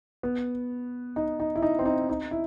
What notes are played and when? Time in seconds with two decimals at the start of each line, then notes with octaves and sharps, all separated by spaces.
0.23 B3
1.16 D#4
1.40 D#4
1.56 E4
1.62 D#4
1.79 C4
1.86 D#4
2.09 D#4
2.31 E4